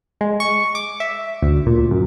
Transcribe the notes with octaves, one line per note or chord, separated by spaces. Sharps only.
G#3
C#6
D6
E5
D2
A#2
F#2